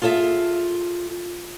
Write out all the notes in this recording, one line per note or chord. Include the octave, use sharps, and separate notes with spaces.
F4 G#4 A4 D#5 E5